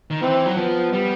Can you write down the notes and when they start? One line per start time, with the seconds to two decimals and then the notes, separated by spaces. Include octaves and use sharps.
0.10 D#3
0.21 E3 C4
0.46 F#3
0.57 F3 B3
0.93 G3